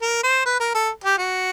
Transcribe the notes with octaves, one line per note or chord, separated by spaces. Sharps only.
A#4
C5
B4
A#4
A4
G4
F#4